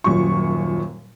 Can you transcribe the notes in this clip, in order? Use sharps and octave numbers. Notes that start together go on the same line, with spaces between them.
D#1 F#2 A#2 C#6